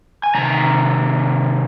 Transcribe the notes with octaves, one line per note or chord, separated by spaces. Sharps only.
G#5
C3 D#3 A#5